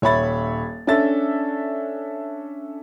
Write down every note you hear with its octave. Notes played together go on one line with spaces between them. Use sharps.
D#1 C#5 E5 B5 A6
C#4 D4 A4 E5 A6